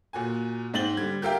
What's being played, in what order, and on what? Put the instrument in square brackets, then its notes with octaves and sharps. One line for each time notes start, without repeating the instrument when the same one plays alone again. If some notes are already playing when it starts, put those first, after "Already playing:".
[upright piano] A#2 F#4 G#5
G#2 C4 A6 F#7 G7
D3 G3 G#6
G4 A#4 E5 F5 G5